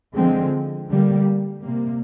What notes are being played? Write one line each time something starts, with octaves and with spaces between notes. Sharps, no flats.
D3 F3 G#3 C4
D3 G3 A#3
C3 G3 A#3